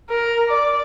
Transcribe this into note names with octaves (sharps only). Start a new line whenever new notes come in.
A#4
D5